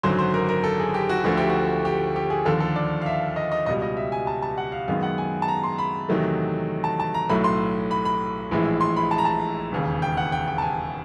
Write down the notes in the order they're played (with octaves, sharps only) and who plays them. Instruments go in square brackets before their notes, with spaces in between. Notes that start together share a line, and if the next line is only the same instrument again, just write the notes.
[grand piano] G#1 F#2 D3 F#3 C5
C5
A#4
A#4
A4
G#4
G4
F#4
D2 D3 F3 A3 F#4
G4
F#4
G4
G4
G#4
D#2 D3 F3 A4
A4
D5
F5
E5
D#5
D#5
C#2 B2 G3 D#5
D#5
E5
G#5
A5
A5
F#5
F5
F#2 D#3 G#3 B3 F5
F#5
G#5
A5
A#5
C6
B5
E2 C3 D#3 F#3 A3
A5
A5
A#5
B1 A2 F#3 A3 B5
C6
B5
B5
A#1 A2 E3 G#3
C6
B5
A5
A#5
A5
E1 D#2 C#3
G5
F#5
G5
G5
A5
G#5